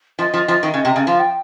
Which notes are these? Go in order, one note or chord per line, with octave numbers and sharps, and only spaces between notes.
F3 D#5
F3
F3
D#3
C#3
C3
C#3
F3 F5
G5